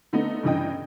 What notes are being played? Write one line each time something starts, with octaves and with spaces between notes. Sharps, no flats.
D3 A3 B3 D#4
G2 C#3 E3 D#4 D#5 G5